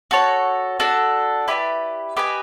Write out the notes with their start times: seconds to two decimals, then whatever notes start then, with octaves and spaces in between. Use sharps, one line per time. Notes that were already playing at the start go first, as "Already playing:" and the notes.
0.11 F#4 A4 C#5
0.80 D4 F#4 A4
1.48 E4 G4 B4 D5
2.17 G4 B4 D#5 G#5